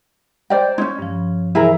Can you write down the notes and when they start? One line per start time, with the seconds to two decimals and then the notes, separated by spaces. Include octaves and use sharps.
0.50 C5 D5 G5
0.78 C#4 D#4 C6 G#6
0.99 G2 F3
1.55 C3 E3 E4 G#4 A#4